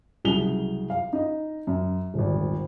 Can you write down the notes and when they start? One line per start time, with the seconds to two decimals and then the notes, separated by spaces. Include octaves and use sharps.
0.25 C2 C#3 F#3 G#4 F7 G7
0.90 F5
1.13 D#4 D#5
1.67 F#2
2.14 D#1 G#1